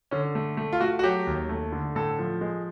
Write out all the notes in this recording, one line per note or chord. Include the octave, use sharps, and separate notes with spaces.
D3 C#4
A3
A3
F4
A3 F#4
F#4
F#3 G4
D#2
A3
D3
A2 A4
F3
G#3